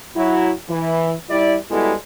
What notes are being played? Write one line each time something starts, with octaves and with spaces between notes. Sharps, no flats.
F#3 E4 F#4
E3
G3 E4 D5
G3 G#3 B3 E4 F#4 A4